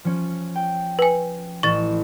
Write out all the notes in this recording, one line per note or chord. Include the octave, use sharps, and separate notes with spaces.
F3 C#4
G5
B4 G#5
A1 C#6 A6 E7